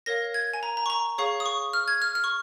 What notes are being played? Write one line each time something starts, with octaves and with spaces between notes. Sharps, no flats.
A#4 C#5 F5 A#6
G#6
G#5
A#5
A#5
C#6
A#5
G#4 C#5 F5 C#6
D#6
C#6
F6
G#6
F6
F6
C#6